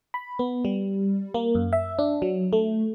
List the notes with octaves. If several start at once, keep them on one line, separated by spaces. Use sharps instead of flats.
B5
B3
G3
A#3
F#2
E5
D4
F#3
A3